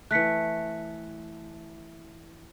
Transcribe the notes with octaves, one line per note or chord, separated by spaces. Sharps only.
E3 A3 F#6 B6 C#7